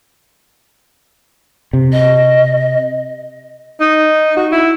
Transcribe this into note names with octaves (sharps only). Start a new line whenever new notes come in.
C3
D#5
D#4
F#4
E4